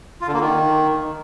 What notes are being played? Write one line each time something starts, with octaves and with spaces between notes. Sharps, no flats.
F4
D3
A#3
D#3